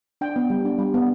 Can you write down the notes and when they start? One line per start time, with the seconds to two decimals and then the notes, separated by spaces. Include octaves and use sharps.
0.21 D4 G5
0.36 B3
0.50 G3
0.65 D4
0.79 G3
0.94 B3